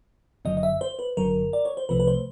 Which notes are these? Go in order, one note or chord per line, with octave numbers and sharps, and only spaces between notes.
G1 F#2 D3 F#3 D#5
D#5
E5
C5
B4
G1 F#2 D3 F#3 A#4
D5
C#5
C5
C2 C3 F3 A3 B4
B4
C5